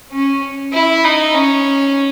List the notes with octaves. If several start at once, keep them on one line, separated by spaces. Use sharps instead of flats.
C#4
E4
D#4
C#4